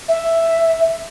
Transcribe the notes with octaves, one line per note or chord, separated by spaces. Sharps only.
E5